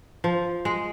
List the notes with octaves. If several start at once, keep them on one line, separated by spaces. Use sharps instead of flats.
F3
G#3